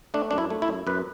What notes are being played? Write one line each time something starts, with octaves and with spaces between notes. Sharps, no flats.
A3 D4
F#2 D4
E4
A3
E4
F#2
F#2 B4